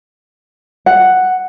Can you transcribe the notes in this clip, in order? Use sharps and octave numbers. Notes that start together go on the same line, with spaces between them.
F#5